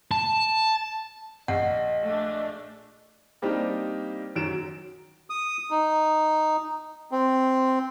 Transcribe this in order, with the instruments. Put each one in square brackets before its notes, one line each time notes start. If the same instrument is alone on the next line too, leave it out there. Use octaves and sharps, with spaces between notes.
[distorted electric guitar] A5
[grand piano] A#1 [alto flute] D#5 [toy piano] F#5
[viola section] A3 D4
[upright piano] G3 A#3 C4 D4 D#4 G4
F#2 D#3 F#3 D7 E7
[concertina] D#6
D#4
C4